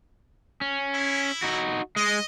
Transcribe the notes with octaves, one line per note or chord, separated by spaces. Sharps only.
C#4
E4
D#4 F#4
G#3 D#5